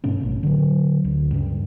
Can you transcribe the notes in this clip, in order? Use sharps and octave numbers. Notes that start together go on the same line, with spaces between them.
G2 B2 A3 C#4
A1 B2
D3 F#3
D2
G2 C#3